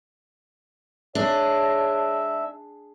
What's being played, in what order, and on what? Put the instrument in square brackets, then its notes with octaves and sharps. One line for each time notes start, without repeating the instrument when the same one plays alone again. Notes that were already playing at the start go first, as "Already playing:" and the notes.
[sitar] G#3 [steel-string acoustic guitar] D4 [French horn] C#5 [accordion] E5